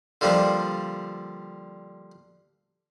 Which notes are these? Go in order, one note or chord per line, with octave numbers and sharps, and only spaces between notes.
D3 F3 G3 A#3 D4